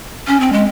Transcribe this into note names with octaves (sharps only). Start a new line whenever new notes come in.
C#4
C4
G#3